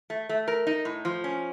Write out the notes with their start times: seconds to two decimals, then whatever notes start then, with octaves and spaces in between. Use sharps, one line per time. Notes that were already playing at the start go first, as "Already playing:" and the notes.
0.10 A3
0.29 A3
0.48 A#4
0.67 D#4
0.85 A2
1.05 F3
1.24 C#4